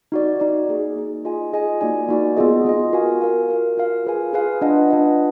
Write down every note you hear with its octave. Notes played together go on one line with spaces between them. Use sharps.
D#4 F#4 D5
D#4 F#4 D5
A#3 D#4 G#4
A#3 D#4 G#4
F4 G#4 D#5 G#5
F4 G#4 D#5 G#5
A#3 D#4 F#4 D5 G#5
A#3 D#4 F#4 D5 G#5
B3 F4 G#4 D#5
B3 F4 G#4 D#5
F#4 A#4 F5 G#5
F#4 A#4 F5 G#5
F4 A#4 F5
F4 A#4 F5
F4 G#4 B4 F5 G#5
F4 G#4 B4 F5 G#5
D4 F4 B4 D#5 F#5
D4 F4 B4 D#5 F#5